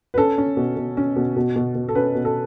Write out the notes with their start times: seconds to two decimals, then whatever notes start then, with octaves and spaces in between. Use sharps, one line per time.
0.14 B4
0.18 C#4 A4
0.38 C#4
0.57 B2
0.76 B2
0.97 C#4
1.16 B2
1.36 B2
1.56 B2
1.75 B2
1.89 A4
1.95 C#4 B4
2.15 B2
2.25 A4